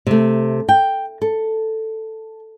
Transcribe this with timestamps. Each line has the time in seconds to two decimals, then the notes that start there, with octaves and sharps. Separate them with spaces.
0.07 C3 A3
0.69 G5
1.22 A4